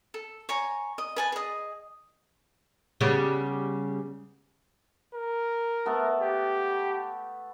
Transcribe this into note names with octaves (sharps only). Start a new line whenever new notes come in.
A4
C#5 G#5 A#5
D#5
B4 G#5 A5
G#4 D#5
C#3 G3 B3
A#4
A3 B3 A4
G4